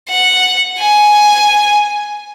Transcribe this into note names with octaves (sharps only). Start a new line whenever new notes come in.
F#5
G#5